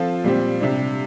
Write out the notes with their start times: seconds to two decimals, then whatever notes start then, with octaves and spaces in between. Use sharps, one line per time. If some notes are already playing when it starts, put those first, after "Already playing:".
Already playing: F3 C4 F4 A4
0.24 A#2 G3 C4 F4
0.61 C3 G3 D4